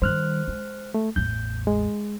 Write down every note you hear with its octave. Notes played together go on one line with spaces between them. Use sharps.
D#3 G3 C5 F6 F#6
G#3
A3
A1 E2 G6
G#3